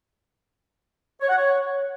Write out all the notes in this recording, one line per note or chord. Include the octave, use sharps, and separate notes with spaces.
C#5
F#5
C#5